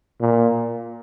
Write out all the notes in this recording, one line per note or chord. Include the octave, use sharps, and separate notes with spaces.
A#2